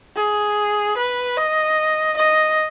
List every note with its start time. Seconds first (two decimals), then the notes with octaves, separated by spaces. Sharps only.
0.16 G#4
0.96 B4
1.37 D#5
2.17 D#5